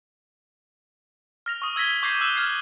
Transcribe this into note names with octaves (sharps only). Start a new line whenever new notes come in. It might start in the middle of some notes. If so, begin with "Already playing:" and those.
F6 A#6 F7
C#6 D#6
E6 G#6 A#6 B6 G7
C#6 D6 G6 G#6 A#6 C7
E6 F#6 E7 G7
F6 G#6 C7